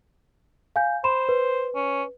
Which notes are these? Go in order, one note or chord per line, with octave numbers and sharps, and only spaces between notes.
F5 G#5 G6
C5 B5 C6 E7
B4
C#4